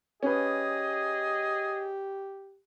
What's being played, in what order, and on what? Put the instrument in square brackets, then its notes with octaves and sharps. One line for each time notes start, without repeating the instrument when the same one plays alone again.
[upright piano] C#4 B4 [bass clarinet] G4 [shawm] G#4 [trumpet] D#5